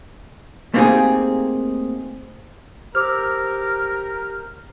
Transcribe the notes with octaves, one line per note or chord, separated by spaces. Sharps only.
A3 A#3 C4 D#4 G4 G#4
G4 A#4 C5 D6 E6 F6